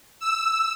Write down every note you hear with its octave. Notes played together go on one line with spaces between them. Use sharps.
E6